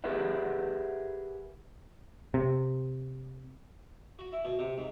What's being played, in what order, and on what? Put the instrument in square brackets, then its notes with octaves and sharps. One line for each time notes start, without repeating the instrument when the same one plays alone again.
[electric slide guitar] G4 G#4 A#4 B4 E5 F#5
[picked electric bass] C3
[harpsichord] F#4
E4
B2
C3
G#2